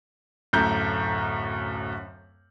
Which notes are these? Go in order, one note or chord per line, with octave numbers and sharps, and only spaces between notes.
D1 F#2 A2 A3 A#5 G6